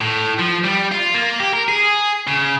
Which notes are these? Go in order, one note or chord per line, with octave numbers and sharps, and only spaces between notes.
A2
F3
G3
F4
A#3
G4
A#4
G#4
C#3